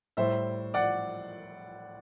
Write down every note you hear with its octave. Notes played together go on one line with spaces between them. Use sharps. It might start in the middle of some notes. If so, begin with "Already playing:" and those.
A2 G3 C5 E5
D5 F#5